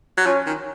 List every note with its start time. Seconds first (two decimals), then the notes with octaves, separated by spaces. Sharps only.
0.17 F#3
0.26 F3 C#4
0.47 D#3